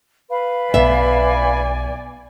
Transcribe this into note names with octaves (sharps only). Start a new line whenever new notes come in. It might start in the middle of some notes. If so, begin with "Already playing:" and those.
B4 F5 B5
B1 B3 D5 E5 G#5